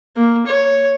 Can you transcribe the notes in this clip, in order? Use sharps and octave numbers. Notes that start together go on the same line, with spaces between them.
A#3
C#5